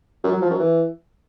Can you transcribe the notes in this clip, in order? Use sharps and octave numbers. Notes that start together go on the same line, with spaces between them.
F#2
F#3
F3
F#2
E3